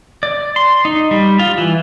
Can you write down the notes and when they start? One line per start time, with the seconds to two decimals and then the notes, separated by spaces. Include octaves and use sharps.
0.23 D5
0.56 C6
0.85 D#4
1.11 G3
1.39 F4
1.58 E3